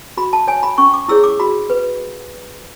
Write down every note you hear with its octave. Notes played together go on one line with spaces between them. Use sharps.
F#4 B5
A5
C#5 G#5
B5
C#4 C#6
D6
E4 G#4 C#5 E6
D6
F#4 B5
B4